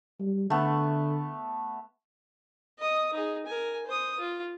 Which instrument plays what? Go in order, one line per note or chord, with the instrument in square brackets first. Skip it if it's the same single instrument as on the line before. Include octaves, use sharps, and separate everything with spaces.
[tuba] G3
[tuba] D3 [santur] A3 B3
[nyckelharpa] D#5 D#6
D#4 G#4
A#4 G#5
C5 D#6
F4